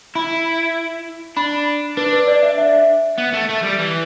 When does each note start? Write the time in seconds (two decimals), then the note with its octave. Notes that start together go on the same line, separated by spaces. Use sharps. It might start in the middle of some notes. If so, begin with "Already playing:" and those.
0.15 E4 B5
1.37 D4 B5
1.97 D4 B4
2.13 B4
2.28 D5
2.43 E5
2.58 E5
3.18 B3
3.34 A3
3.49 A3
3.63 G3
3.79 E3